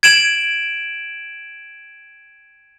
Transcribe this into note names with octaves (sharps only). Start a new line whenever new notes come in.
G#6 D7 E7 F#7